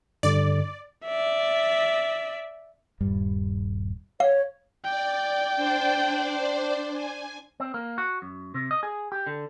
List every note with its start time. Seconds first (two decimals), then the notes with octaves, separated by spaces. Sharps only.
0.23 G2 D3 D5
1.06 D5 E5
3.01 D#1 G2 G3
4.20 C#5 F5
4.84 D5 G5
5.56 D4 C5 D5
6.93 G#5
7.60 C4
7.74 A#3
7.98 F#4
8.22 F#2
8.54 C3
8.71 D#5
8.83 G#4
9.12 G4
9.27 D3